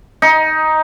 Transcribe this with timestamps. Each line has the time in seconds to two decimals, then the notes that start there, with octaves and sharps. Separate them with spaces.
0.22 D#4